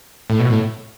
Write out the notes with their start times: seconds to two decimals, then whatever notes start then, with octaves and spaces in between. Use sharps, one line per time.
0.30 A2
0.40 B2
0.50 A2